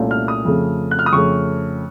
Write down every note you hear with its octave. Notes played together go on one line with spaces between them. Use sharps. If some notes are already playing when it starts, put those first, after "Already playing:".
Already playing: C2 A#2 A3 C#4 F4
F6
D#6
F2 C#3 A3
F#6
F6
D#6
F2 C#3 A3 C#6